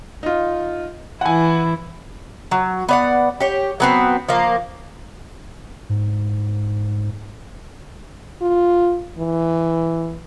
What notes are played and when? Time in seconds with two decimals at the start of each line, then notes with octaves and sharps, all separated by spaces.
0.23 D#4 F4
1.21 E3 E4 F#5 G#5
2.51 F#3
2.89 B3 D5 F#5
3.40 G4 C#5
3.80 F#3 B3 C4
4.29 F3 A#3
5.89 G#2
8.42 F4
9.18 E3